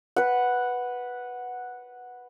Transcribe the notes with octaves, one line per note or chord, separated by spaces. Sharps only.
B4 F#5